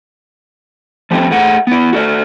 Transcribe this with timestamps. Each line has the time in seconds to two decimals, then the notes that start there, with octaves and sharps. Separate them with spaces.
1.11 F3 G3 A3 B3 C4
1.31 A3 G#4 F#5
1.67 B3 E4
1.93 F#4 A4 D5